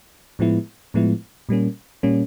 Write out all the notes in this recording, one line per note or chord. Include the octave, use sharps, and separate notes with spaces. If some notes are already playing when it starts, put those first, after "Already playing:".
A2 F3 G#3 B3 E4
A2 F3 G#3 B3 E4
A#2 G3 A#3 C#4
A#2 G3 A#3 C#4